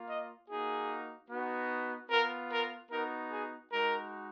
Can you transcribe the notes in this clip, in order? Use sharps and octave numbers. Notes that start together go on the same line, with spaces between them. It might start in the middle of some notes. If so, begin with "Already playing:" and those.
Already playing: A#3 F4
D#5
A#3 D#4 F#4 G#4
B3 D#4 F#4
B3 F4 A#4
A#4
B3 D#4 F#4 A#4
G#4
G#3 D#4 F#4 A#4